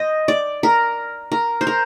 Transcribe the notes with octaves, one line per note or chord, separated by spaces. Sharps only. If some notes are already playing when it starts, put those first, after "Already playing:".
Already playing: C5 D#5
D5
A#4
A#4
C5
A#4